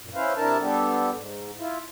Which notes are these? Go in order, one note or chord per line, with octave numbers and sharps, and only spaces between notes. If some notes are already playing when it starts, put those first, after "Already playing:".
F#2 A#2
C#4 E4 B4 C5 F5
C3 D4 E4 A#4 A5
G3 B3 D4 G4 A4
G#2
E4 F4